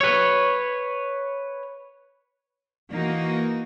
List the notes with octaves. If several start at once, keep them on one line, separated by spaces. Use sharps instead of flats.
B4 C#5
E3 A#3 D#4 F#4